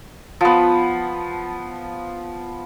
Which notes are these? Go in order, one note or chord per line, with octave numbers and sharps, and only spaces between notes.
F3 B3